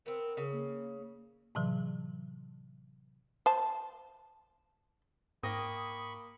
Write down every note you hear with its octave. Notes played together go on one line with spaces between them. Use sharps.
B3 C4 A#4
C#3
A#3
A2 C3 E3 F#3
C5 A5
G#2 A#3 G5 B5 C#6 D#6 A#6